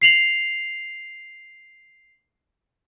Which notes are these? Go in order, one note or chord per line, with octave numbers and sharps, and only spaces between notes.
C7 F7 F#7